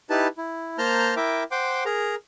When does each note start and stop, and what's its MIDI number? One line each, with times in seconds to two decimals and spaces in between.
0.10 0.28 63
0.10 0.28 64
0.10 0.28 67
0.10 0.28 71
0.10 0.28 81
0.38 0.78 64
0.78 1.14 58
0.78 1.14 72
0.78 1.14 81
0.78 1.14 82
0.78 1.14 89
0.78 1.14 91
1.16 1.43 64
1.16 1.43 70
1.16 1.43 76
1.16 1.43 79
1.16 1.43 86
1.51 1.84 72
1.51 1.84 78
1.51 1.84 79
1.51 1.84 84
1.51 1.84 86
1.85 2.15 68
1.85 2.15 70
1.85 2.15 82